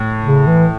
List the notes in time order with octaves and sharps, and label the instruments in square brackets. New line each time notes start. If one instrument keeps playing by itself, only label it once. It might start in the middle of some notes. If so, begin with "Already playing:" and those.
Already playing: [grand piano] A2
[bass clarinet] C#3
E3